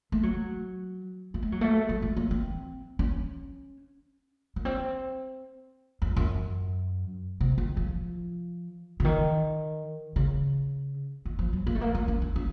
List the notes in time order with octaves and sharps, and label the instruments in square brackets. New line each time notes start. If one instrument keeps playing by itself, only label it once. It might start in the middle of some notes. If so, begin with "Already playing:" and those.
[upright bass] A3
F#3
A#3
A3
F#3
A3
F#3
A3
A#3
C4
C#4
A#3
C4
F2
F#2
C3
D#3
F3
C#3
D#3
C#3
D#3
F3
F#3
A#3
A3
A#3
A#3
C#4
D#4
C#4